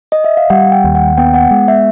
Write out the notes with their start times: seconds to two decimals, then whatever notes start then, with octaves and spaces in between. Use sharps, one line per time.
0.12 D#5
0.24 E5
0.37 F5
0.50 G3 F#5
0.72 G5
0.84 D#2
0.95 F#5
1.17 B3 G5
1.34 F#5
1.51 G#3
1.68 E5